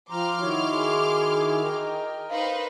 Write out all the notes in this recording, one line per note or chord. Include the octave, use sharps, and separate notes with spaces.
F3 G5 A#5 C6 D6 F6
D#3 E4 F#4 C#5
G#4
A#4 D#5 G5
D#4 B4 C5 F5